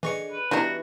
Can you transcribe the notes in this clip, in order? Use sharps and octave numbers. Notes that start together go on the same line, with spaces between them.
E3 D4 G#4 D#5 C#6 C#7
B4
E3 G3 B3 D4 D#4 F#4